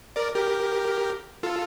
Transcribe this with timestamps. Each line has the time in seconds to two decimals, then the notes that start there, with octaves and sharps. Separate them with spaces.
0.16 A#4 D5
0.34 G4 A#4
1.43 F4 A4